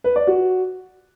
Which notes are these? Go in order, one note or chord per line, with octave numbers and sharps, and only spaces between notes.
B4
D5
F#4